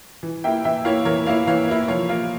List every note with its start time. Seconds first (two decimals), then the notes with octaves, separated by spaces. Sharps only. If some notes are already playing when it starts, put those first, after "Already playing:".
0.23 E3
0.44 A#3 E4 E5 G5
0.64 E3 E5 G5
0.85 A#3 E4 C#5 F5
1.05 E3 A#4 C#5
1.26 A#3 E4 C#5 F5
1.47 E3 C#5 F5
1.68 A#3 E4
1.88 F3 C#5 F5
2.09 A#3 F4